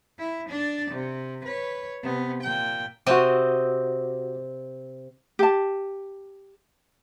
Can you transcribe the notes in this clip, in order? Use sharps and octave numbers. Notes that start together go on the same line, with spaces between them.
E4
D4 D5
C3
B4 C#5
C3 B3
A#2 G5
C3 C4 F#4 D#5 D6
G4 A5